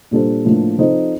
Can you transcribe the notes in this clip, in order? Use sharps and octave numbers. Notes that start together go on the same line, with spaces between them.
A#2 G3 D4 A4 C5
A2 F3 A#3 D4
F3 C4 D#4 A4 C5